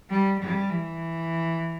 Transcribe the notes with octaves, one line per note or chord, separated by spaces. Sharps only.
G3
G3
E3